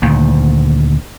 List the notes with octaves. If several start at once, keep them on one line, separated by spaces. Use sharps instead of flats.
D2 A#2 D#3